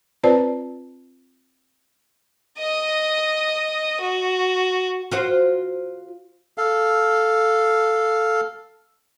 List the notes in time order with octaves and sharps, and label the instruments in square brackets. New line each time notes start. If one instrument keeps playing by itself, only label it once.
[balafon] C4 F4 B4 C5 D5 A5
[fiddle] D#5 D#6
F#4
[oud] F4 F#4 C5
[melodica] A4 F5